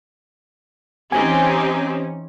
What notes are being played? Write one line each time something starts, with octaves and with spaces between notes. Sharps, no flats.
E3 C4 C#4 D#4 G4 G#5